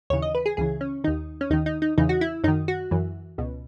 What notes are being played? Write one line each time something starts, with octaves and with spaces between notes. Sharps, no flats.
D#2 C#3 E3 C#5
D#5
B4
G#4
C#2 C#3 E3 G#4
C#4
D#2 D#3 D#4
C#4
D#2 D#3 D#4
D#4
D#4
E2 C#3 E3 D#4
F#4
E4
F#2 D#3 D#4
F#4
F#2 E3
C#2 B2